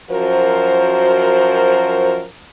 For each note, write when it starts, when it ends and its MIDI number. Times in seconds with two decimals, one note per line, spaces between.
0.10 2.24 42
0.10 2.24 53
0.10 2.24 66
0.10 2.24 70
0.10 2.24 72